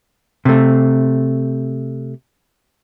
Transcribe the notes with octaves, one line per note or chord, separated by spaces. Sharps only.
C3 A3